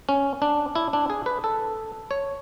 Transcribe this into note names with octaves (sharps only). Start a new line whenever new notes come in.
C#4
D4
E4
D4
G#4
B4
A4
C#5